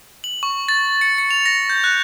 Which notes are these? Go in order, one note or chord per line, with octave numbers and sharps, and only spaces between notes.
F#7
C#6
A6
C#7
C#7
F7
A#6
G6
F#6